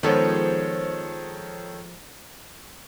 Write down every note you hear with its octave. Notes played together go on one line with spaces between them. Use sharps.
D#3 F3 G#3 B3 A4 C#5